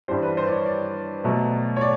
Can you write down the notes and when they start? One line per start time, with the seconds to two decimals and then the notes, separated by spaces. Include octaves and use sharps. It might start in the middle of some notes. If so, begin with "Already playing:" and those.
0.08 G2 E3 G3 C5
0.23 B4
0.37 C5
0.47 D5
0.52 C#5
0.66 D5
1.24 B2 F#3 A3
1.76 C#5
1.81 D5